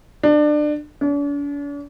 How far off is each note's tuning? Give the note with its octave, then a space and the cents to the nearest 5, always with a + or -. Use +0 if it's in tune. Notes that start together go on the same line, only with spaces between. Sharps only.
D4 +25
D4 -45